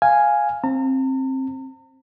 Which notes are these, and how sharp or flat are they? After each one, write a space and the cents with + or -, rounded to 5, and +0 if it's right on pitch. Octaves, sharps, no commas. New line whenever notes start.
F5 +0 G#5 +0
C4 +20 A#5 -45